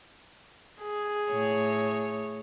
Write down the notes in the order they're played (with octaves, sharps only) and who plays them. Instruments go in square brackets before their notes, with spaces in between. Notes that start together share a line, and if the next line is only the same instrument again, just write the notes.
[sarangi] G#4
[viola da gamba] A2 C#5